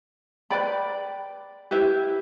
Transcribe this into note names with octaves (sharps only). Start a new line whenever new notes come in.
B4 D5 G5 B5
E4 G4 B4 E5